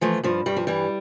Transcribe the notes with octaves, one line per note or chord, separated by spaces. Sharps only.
E3 F3 A3
G2 F3
G2 G3
F3
E3 G3